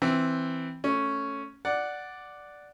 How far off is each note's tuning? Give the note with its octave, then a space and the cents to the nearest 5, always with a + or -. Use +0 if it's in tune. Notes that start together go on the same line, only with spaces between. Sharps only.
E3 +0 C4 +0 G5 +5
A3 +0 C#4 +0
D5 +0 F#5 +0